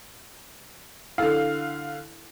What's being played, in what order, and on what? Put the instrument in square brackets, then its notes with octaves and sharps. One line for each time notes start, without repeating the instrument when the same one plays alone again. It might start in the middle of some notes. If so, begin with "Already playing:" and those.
[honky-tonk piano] D3 F5 [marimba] E4 A4